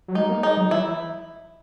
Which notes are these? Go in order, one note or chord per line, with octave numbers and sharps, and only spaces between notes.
F#3
G#3 D#4
A#3
G#3 D#4
F#3
E3 E4